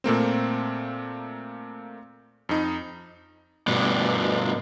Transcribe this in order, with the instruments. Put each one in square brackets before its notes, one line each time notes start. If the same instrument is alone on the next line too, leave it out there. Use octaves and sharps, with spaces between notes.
[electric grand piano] A#2 A3 A#3 C4
F2 D#4
[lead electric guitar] G2 B2